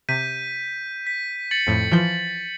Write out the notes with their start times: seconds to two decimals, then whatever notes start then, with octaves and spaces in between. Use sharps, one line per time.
0.09 C3 G6 B6 D#7
1.07 B6
1.51 A6 C#7 F#7
1.67 F2 A2
1.91 E3 F3 G6